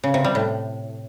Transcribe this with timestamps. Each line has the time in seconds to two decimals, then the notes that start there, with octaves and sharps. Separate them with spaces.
0.04 C#3
0.14 C3
0.24 G3
0.35 A2